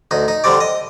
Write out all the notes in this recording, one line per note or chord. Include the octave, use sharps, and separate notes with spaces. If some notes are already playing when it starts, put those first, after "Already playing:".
D2 D#4
D#4
D3 G3 C4 D5
D#5